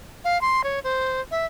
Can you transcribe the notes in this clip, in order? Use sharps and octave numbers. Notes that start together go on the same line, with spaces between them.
F5
C6
C#5
C5
E5